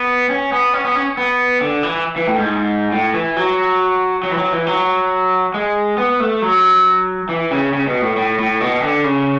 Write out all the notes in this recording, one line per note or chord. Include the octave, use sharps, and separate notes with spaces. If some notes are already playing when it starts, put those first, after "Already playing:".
Already playing: B3
C#4
B3
C#4
B3
C#4
B3
D3
E3
E3
A2
G#2
A2
E3
F#3
F#3
E3
F#3
E3
F#3
G#3
B3
A3
F#3
E3
C#3
C#3
B2
A2
A2
A2
B2
D3
C#3